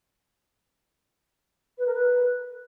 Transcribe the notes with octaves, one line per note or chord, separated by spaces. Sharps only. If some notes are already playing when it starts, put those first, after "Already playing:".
B4
A#4
B4